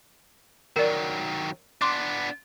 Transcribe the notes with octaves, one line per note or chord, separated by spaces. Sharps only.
D#3 F#3 A#4 D5
B3 D4 C6 D6